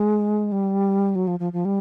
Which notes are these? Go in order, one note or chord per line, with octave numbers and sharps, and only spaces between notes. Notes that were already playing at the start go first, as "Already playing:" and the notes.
Already playing: G#3
G3
F#3
F3
F3
F3
G3